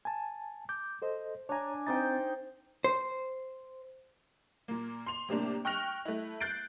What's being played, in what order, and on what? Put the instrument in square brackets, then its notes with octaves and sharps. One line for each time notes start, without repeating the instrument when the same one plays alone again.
[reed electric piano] G#5 A5
D6 G6
A4 C5 D#5
[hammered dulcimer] D4 G#5 [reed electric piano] C#5 A#5
[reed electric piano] C4 A6 [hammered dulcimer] D#4 C5 G5
[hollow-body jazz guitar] C5
[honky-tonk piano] A#2 A#3
C6 F7
A2 C3 A#3 D4
G5 C#6 F6 F#6 A#6 F7
A3 E4
F#6 G6 A6 C7 D7